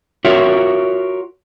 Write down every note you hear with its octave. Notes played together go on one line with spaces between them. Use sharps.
F4 F#4 A#4 C#5 E5